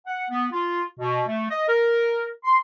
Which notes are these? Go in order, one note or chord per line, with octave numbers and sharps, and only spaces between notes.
F#5
B3
F4
B2
A3
D#5
A#4
C6